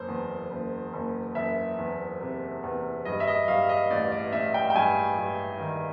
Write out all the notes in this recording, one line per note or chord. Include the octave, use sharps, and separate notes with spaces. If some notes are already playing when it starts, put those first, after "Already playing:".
Already playing: F#1 C5
E2
F#1
F#1
F#1 E5
E2
C3
E2
G2 D#5
E5
D#5
G2 F5
D#5
A1 D5
D5
A1 E5
G5
G5
G2 G#5
G2
D#3